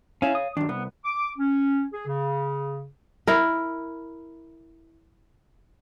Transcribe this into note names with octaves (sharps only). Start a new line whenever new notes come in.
C#4 E4 C#5 F5
D#6
F#2 D#3 D4
C2 B3
D6
C#4
G#4
C#3
E4 A#4